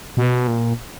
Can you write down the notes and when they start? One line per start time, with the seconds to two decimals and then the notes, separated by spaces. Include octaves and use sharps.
0.17 B2
0.47 A#2